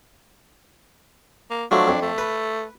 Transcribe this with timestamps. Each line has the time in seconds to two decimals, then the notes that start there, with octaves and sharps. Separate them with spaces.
1.50 A#3
1.71 F3 F#3 A3 D4
1.88 F2
2.02 A3
2.18 B4